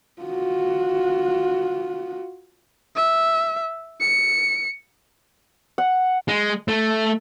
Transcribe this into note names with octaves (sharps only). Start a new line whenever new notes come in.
F4 F#4
E5
C#7
F#5
G#3
A3